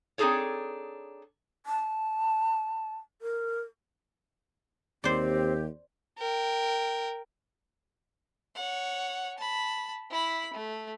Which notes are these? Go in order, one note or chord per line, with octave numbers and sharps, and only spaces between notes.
C4 D4 D#4 G#4 A4 C#5
A5
A#4
D#2 C4 G4 C5 D5
A#4 G5
C#5 F#5
A5 B5
E4 B5
A3